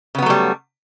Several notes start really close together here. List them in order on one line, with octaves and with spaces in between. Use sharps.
C#3 B3 F#3 A3 G3